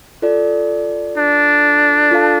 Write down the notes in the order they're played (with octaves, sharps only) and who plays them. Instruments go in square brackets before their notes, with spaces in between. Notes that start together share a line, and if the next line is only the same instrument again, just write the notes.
[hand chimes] F4 A4 D5
[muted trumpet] D4
[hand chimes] F4 A4 F5 A5